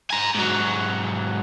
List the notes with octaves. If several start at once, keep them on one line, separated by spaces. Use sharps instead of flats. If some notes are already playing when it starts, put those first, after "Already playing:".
G#5 A#5
G#2 F#3